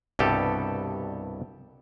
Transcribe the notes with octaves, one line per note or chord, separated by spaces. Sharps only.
C2 G2 B2 G4 A4